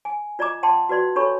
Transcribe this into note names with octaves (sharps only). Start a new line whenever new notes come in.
G#5
F4 D5 D#5 A#5 D6
F#5 G5 A5 C6
F#4 B4 D5 C6
D4 G4 A4 C#5 B5 C#6